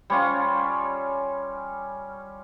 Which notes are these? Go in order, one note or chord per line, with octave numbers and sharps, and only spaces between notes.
G3 C#4 F4